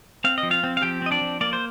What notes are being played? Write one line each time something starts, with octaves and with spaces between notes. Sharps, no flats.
C4 F5
D#5
F3
F4 F5
C4
F5
F3 G4 G5
C4 D#5
D4 D5
F3
A#3 D5
C5